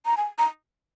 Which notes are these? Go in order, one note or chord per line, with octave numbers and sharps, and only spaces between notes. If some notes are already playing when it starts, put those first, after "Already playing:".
A#5
G#5
A#5